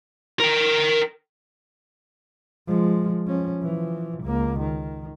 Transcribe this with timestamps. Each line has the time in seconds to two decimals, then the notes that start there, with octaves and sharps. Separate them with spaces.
0.40 A#4 G5
2.68 F3 G#3
3.27 F3 C#4
3.63 E3 F3
4.24 C#2 A#3
4.59 D#3